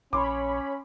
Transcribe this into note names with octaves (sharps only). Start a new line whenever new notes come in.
A#1 C#4 C#5 B5 C6 D6